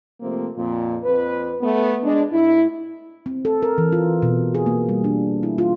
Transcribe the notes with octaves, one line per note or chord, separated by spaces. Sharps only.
C3 F3 A3 A#3 C4
F2 A#2
F2 B4
A3 B3
G#3 D4
A2 E4
C4
A4
A#4
E3
F4
B2
G#4
A#3
G3
D4
E4
F4